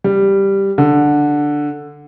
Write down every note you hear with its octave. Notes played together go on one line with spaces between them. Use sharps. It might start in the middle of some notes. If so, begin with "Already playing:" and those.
G3
D3